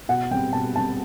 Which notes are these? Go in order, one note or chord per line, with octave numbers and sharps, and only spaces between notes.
B2 F#5
G3 C4 G5
B2 A5
G3 C4 A5